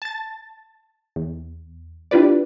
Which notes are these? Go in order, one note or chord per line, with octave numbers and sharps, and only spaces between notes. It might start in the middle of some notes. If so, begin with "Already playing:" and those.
A5 A6
E2
D4 E4 F4 G4 B4 D5